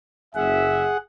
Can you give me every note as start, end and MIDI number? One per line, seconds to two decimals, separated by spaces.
0.35 0.87 30
0.35 0.97 68
0.35 0.87 76
0.35 0.97 78